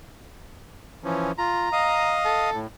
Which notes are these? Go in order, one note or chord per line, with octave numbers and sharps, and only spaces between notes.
E3 F3 C#4
F4 A#5
D#5 F5 D#6
A4
A2